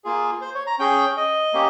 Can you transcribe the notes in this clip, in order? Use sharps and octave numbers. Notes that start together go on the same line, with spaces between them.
A#3 F4 G#4
C5
C#5
A#5
C#4 G#4 G5
D#5
A#3 C#4 G4